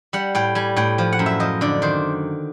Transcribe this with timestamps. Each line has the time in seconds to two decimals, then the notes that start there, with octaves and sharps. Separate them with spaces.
0.13 G3 F#5
0.35 A2 G5
0.55 G3 G#5
0.76 A2 G5
0.98 F3
1.12 F#5
1.19 F#2
1.26 E5
1.40 F3 D#5
1.61 D3 D5
1.82 D#3 C5